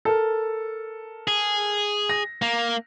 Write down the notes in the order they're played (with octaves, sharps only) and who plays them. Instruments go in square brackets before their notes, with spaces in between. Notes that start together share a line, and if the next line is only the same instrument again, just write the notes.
[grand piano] A4 A#4
[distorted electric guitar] G#4
[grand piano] A#6
[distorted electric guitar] A#3